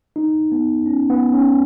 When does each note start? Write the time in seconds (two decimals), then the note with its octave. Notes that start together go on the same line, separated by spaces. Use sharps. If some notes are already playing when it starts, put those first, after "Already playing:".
0.16 D#4
0.52 B3
0.86 C#4
1.10 B3
1.33 C#4